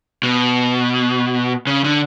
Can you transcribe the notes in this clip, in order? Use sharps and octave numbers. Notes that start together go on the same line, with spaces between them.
B2
C#3
D3